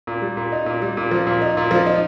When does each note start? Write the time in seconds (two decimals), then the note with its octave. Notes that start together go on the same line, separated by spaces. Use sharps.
0.07 A#2
0.22 G3
0.37 A#2
0.52 D#4
0.66 A#2
0.82 G3
0.97 A#2
1.11 F3
1.27 A#2
1.42 D#4
1.57 A#2
1.71 F3
1.86 D#4